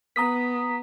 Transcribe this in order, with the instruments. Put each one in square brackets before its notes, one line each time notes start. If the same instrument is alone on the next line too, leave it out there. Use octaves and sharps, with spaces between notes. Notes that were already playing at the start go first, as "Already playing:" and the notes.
[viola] B3 [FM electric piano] A#5 D#6 B6